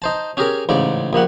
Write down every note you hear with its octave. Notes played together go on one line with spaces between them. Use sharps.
D#4 C5 A5
C#4 G4 G#4 A#4
A1 G#2 C#3 D5
A#1 A#2 G3 F#5